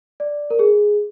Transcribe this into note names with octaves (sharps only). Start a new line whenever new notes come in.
D5
A#4
G#4